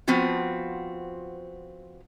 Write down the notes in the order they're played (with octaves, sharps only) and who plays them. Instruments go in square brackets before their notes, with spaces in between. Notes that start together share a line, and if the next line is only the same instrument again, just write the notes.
[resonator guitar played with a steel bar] F3 B3 C4 F4 F#4